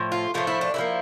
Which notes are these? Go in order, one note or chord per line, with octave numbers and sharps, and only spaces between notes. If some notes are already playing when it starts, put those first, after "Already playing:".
Already playing: A2 F3
F4
A2 F3 A3 F4
E4
D4
D3 F3 A#3 E4